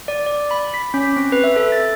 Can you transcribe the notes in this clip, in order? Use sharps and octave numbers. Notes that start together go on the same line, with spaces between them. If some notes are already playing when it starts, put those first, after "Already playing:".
D5
D5
B5
B6
C#4
C4
B4
E5
A4
A6